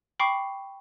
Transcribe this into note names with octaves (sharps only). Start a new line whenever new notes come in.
G5 B5 C#6 D6 C7